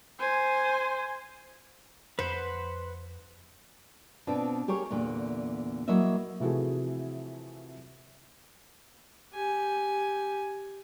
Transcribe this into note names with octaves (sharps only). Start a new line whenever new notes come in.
C5 G#5
F2 B4 C5 F#5 B5
B2 B3 C4 D4 F4
G4 G#4 A#4 C#5
E2 A#2 D3
F#3 A#3 E4 D#5 E5
C3 E3 F3 A3 F#4 G#4
G4 G#5